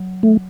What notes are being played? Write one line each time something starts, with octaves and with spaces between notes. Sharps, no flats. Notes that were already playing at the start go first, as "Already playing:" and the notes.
Already playing: F#3
A3